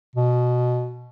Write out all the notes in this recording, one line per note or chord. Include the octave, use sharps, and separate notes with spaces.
B2